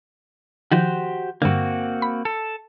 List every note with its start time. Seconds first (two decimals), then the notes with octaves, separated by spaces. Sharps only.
0.72 D#3 F3 F#4 G4 C5
1.42 G2 D3 A#3 C4 F#4
2.02 B5
2.25 A4